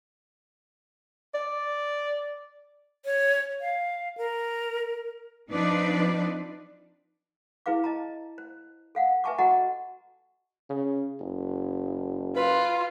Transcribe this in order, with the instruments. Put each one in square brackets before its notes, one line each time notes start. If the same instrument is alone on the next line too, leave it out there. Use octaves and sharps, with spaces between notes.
[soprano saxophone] D5
[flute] C#5
F5
A#4
[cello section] F3 C4 D4 D#4 B4 D5
[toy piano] E4 G#4 B4 F5 D6
D#5 A5 A#5
C5
A4 F5 F#5
B4 E5 G#5 A5 C#6 D6
F#4 A4 D#5 F#5 A#5 C#6
[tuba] C#3
F#1
[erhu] F4 [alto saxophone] B4